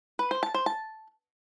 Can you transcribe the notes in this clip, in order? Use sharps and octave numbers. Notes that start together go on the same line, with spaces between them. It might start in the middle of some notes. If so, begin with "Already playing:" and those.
B4
C5
A5
C5
A5